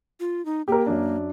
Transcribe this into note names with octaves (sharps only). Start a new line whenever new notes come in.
F4
D#4
A#3 G4 A#4
F#2 D4